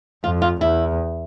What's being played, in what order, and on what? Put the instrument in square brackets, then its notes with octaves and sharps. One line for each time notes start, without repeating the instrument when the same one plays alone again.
[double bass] F2 [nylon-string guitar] F4
[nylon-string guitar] F4
[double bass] E2 [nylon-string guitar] E4